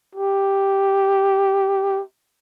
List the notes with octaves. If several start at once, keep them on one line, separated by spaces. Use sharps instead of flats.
G4